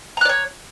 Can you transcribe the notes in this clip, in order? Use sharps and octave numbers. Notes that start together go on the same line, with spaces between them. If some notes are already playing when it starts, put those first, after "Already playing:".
C#5 D5 A#5 F#6